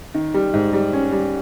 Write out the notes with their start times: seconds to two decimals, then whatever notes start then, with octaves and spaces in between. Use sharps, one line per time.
0.15 D#3
0.34 G3
0.54 G#2
0.73 G3
0.93 C#4
1.12 G3